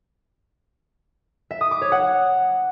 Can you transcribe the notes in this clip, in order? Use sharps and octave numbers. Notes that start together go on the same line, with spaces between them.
E5
D#6
D6
C#5
F#5